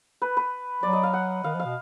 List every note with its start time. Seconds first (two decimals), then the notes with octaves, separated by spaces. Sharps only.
0.22 B4
0.37 B4
0.83 F#3 D5
0.93 D#5
1.03 F5
1.13 F#5
1.44 D#3 F5
1.55 F3 F5
1.65 B2